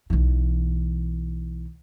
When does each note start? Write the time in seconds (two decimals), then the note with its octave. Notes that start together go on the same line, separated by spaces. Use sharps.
0.10 B1 E3